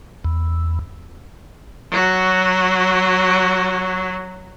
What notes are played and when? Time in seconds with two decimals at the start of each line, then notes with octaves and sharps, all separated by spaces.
0.24 E2
1.91 F#3 F#4